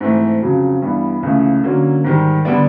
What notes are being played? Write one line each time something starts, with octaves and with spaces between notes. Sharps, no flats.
G#2 E3 A3 C4
F2 C#3 F#3
G2 E3 G3 B3
C#2 C#3 E3 A3
D3 F#3 A#3 C#4
G#2 D#3 G3
D3 G3 B3 D4